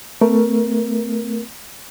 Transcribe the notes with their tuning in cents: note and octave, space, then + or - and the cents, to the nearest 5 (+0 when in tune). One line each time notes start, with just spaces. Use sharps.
A3 +15 C4 -40 A#4 +25